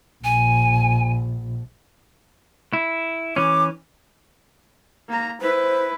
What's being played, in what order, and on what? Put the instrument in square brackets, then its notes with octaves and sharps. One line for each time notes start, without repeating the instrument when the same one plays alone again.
[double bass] A#1 [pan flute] G#5
[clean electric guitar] E4
[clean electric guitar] E3 C#4 [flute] D6
[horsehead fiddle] A#3 A#5
[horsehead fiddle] E4 B4 [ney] C5